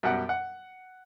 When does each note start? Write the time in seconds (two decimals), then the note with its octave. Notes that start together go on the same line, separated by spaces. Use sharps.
0.03 F#2 B2 G3 F#5
0.29 F#5